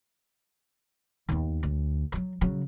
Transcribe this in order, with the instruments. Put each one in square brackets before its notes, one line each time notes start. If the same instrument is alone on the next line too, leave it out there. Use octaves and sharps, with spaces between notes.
[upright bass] D#2 B3
D2
F3 F#3
C#3 F#3